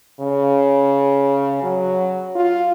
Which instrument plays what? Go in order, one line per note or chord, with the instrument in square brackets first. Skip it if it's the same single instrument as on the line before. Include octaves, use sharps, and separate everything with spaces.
[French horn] C#3
F#3
F4